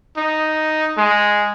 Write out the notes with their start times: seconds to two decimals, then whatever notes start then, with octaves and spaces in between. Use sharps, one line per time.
0.17 D#4
0.97 G#3